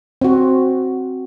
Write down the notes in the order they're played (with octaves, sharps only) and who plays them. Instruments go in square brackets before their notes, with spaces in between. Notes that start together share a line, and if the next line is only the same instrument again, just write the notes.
[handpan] C4 F#4